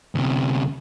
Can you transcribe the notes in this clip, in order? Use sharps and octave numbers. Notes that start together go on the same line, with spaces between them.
D2 C3